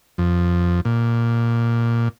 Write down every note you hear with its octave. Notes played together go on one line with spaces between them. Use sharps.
F2
A#2